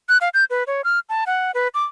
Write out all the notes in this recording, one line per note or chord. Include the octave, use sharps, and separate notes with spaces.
F#6
F5
G6
B4
C#5
F6
A5
F#5
B4
D6